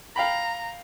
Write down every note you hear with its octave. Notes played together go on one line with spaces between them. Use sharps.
F5 G5 A#5 B5